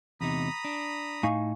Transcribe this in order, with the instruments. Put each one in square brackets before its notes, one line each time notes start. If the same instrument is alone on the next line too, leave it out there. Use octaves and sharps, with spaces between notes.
[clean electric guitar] E2 C3 D#4 [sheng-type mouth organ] A#5 B5 D#6
[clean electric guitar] D4
[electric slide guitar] A2 D#4 D#5 [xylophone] F5 G#5 C#6